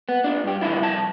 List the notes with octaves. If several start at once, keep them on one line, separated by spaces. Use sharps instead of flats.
B3
D4 F4
G2 G4
A#2 D#3 E3 G3 E4 F4
C2 F2 A5